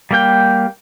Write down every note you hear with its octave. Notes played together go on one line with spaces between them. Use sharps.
G3 A#3 G5